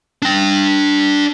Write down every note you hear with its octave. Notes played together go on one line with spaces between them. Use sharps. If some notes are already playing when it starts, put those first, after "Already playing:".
D4 G5